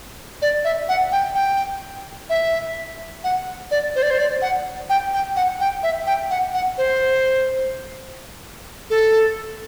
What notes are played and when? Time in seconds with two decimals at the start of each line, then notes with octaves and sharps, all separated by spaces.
0.42 D5
0.64 E5
0.89 F#5
1.12 G5
1.35 G5
2.30 E5
3.24 F#5
3.71 D5
3.96 C5
4.03 D5
4.11 C5
4.19 D5
4.42 F#5
4.90 G5
5.13 G5
5.36 F#5
5.60 G5
5.83 E5
6.07 G5
6.30 F#5
6.54 F#5
6.78 C5
8.90 A4